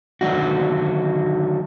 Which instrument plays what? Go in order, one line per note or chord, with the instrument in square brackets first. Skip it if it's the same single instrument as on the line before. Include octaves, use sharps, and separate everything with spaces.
[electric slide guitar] D3 D#3 F#3 D4 F#4